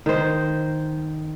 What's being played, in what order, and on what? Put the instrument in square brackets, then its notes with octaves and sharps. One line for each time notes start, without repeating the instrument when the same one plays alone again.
[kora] D#3 C5